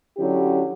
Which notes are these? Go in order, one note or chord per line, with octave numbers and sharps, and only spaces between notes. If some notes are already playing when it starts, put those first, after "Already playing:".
D3 F#3 C#4 E4 G4